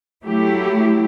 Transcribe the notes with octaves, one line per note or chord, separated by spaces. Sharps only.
F#3 A3 E4 G4